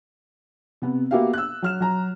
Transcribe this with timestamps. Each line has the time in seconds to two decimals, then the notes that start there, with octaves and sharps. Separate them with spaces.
0.82 C3 B3
1.11 A#3 B3 F#4 G4 E5 F5
1.34 E6 F#6
1.62 F#3 F6 E7
1.80 F#3 A#5